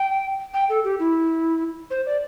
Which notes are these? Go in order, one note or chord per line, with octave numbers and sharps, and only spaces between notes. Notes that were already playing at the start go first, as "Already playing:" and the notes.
Already playing: G5
G5
A4
G4
E4
C5
D5